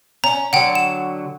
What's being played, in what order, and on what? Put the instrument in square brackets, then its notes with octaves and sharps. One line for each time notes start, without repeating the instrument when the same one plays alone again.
[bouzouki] C#4 [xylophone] A#5
[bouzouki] D3 F#3 [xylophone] F#5 G5
[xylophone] E7